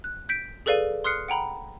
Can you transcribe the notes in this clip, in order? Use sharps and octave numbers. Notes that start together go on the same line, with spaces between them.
F#6
G6 B6 D7
G#4 A4 B4 D5 F5 D#7
C6 D#6 F6 F#6 C7 C#7
F#5 G5 A#5 B5